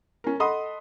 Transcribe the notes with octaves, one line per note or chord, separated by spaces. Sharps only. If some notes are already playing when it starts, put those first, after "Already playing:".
C#4 A#4
A4 D#5 F#5 B5 C6 D#6